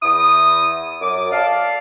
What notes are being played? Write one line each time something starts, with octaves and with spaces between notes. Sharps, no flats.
E2 E4 D#6
F#2 D6
A4 D5 F5